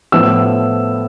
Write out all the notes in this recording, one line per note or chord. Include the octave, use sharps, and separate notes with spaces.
A2 F3 B3 E6